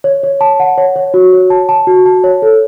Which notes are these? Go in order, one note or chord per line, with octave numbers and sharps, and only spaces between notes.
C#5
C#5
A5
F#5
C#5
C#5
F#4
C#5
A5
A5
F#4
A5
C#5
A4